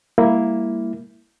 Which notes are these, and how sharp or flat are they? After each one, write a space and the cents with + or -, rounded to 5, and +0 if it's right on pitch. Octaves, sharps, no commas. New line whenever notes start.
G3 +40 A#3 +0 E4 +0